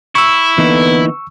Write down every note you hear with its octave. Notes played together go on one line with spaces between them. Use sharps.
E4 C#6 E6
D3 E3 A#3 B3 D#4